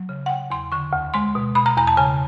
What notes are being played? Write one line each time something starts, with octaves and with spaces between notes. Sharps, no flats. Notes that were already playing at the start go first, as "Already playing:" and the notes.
Already playing: F#3
C#3
F#5
C#3 G5
E2 C6
D3 C#6
D2
G#3 C6
B2
B2 B5
A#5
E2 A#5
A5
C#3 G#5